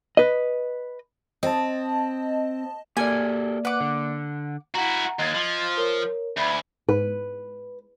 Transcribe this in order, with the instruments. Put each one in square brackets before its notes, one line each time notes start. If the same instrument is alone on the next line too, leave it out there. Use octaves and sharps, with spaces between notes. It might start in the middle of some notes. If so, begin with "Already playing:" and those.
[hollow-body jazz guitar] B4 D#5
[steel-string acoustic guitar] C4 [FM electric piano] D#5 A5
[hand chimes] A#3 D5 [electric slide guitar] G4 A4 A#4 [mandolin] G#5
[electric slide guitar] B4 [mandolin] F#5 D6
[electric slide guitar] D3
[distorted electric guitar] E4 F#4 [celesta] F#5 A#5
[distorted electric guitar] D#2 [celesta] D#5 G#6 A6
[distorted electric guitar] F3
[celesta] A#4 C#5
[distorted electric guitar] D2 [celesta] E5 B5 G#6
[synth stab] G#2 [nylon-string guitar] B4